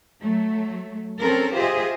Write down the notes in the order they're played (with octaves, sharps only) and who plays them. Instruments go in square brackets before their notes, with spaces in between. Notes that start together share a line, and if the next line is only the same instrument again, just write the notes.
[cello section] F#3 A3
C4 C#4 A4 A#4
F4 G4 G#4 C5 D#5 E5